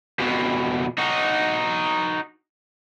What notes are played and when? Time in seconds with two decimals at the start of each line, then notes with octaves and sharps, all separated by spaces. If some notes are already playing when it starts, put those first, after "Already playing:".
0.20 F2 B2
0.98 D#4 F#4